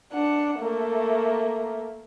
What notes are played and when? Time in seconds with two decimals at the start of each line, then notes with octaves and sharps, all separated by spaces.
0.12 D4 F#5
0.60 A3 A#3